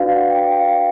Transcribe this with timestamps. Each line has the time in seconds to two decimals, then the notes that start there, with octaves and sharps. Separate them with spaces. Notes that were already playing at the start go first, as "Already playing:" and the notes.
Already playing: D4 F#4 B4 D5 F5
0.16 F#5
0.30 G5
0.45 G5
0.59 F5